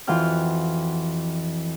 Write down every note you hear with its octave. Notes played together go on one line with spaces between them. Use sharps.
F2 E3 F4 F#4 G5 F6